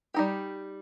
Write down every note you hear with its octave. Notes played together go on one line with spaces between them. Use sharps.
G3 D#4 G4